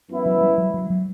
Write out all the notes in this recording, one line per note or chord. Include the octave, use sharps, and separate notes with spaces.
F#2 E3 B3 E4
F#3
G3
F#3
F#3
F#3